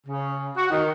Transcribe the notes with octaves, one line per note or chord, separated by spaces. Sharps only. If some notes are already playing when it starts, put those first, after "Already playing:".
C#3
F#4
D#3